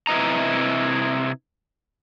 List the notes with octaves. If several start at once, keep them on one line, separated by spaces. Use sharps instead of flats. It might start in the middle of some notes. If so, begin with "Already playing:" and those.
C3 E4 B4 D#5 A#5